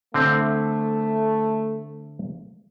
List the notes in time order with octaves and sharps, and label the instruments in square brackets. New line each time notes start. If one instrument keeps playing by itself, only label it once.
[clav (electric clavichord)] D3 C4 [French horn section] A3